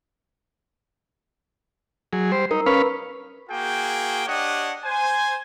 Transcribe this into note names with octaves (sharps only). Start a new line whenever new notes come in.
F#3 G#4
G3 C5
D#4 A#4
C#4 A#4 B4 F5 B5
A#3 F#4 G#4 G5
D4 G4 C#5 D#5 F#5
C5 G#5